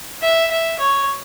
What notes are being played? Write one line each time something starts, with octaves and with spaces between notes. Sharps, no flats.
E5
E5
C#5